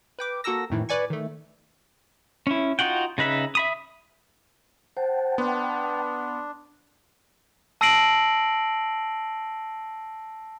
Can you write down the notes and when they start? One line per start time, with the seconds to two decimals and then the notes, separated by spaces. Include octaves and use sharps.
0.19 B4 G5 D6
0.44 A#3 F#4 A4 A#4 E6 A#6
0.70 F2 A2 D#3 E3
0.89 B4 D5 G#5 C#6
1.10 D#3 A3
2.47 C#4 E4
2.79 D#4 F4 F#4 F#5 G5
3.18 C#3 D#4 B4 E5
3.55 E5 B5 D#6
4.97 C5 F#5 G5 A5
5.38 B3 D4 C6
7.81 A5 E6 A#6 C7 D7 F#7